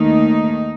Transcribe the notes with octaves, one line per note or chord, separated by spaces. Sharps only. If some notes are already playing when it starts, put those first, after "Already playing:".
Already playing: D#2 D#3 A3 D#4